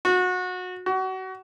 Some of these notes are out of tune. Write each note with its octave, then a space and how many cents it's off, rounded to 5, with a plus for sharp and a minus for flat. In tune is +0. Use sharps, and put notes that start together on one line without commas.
F#4 -25
F#4 +30